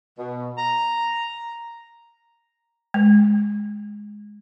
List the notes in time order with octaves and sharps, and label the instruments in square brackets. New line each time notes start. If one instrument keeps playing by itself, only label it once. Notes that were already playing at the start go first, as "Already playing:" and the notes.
[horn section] B2
A#5
[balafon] G#3